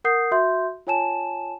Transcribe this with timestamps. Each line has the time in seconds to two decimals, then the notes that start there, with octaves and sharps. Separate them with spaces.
0.04 A#4 F#5 D#6 G6 C7
0.31 F#4 E5 C6 G6
0.87 F4 C#5 G#5 A5 E7